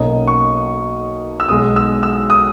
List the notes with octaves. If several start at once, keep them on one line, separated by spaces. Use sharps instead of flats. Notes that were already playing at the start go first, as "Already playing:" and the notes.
Already playing: B1 B2 A#3 C#4 D#5
C#6
E6
B1 B2 G#3 D#6
E6
E6
D#6